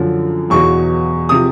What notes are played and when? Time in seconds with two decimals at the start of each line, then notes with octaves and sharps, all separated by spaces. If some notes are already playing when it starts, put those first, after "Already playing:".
Already playing: F#2 D3 F3
0.50 E2 B2 F#3 C#6
1.29 C3 F3 D#6